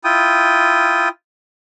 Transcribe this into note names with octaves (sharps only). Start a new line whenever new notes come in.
E4 F4 G5 D#6